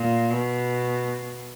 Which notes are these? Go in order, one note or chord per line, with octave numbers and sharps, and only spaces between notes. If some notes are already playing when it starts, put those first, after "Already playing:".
Already playing: A#2
B2